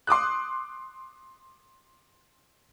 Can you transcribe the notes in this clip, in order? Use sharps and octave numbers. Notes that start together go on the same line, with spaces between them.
C6 D6 D#6 F#6